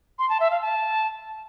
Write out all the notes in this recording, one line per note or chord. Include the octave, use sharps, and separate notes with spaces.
C6
A5
E5
F5
A5